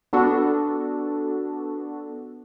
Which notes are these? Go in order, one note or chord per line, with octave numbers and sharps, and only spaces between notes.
B3 D4 F#4 A4